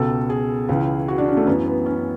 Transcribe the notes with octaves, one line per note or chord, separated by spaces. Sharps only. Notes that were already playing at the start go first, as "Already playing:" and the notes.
Already playing: C#2 B2 A4
G#4
C#2 C#3 E3
F#4
D4
C#4
A3
F#2 E3 B3
B3
C#4